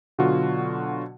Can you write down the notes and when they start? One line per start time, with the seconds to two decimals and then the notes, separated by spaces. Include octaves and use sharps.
0.18 B2 D3 F#3 F4 F#4